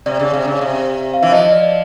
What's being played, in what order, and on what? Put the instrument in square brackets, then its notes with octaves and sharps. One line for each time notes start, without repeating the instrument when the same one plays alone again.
[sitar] C3 [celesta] D5
[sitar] C#3
C3
C#3
C3
[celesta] F5
[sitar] E3 [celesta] E5
[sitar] F3 [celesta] D#5
[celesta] D5